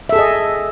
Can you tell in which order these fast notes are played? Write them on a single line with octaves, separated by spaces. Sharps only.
E5 A4 G#4 D#5